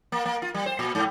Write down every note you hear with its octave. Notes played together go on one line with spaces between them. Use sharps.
A#3
A#3
F4
G3
C5
A#2
G#2